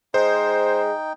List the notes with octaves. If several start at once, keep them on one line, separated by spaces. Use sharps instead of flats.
G#3 D#4 C5 G5